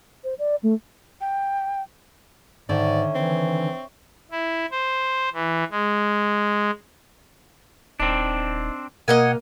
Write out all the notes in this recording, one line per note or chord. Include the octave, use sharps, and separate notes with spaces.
C5
D5
A3
G5
G#2 D3 D#3 C#5 D5 E5
E3 C4
E4
C5
E3
G#3
D#1 C4 D4 D#4
B2 A#3 A#4 D#5 F5 F#5 G#5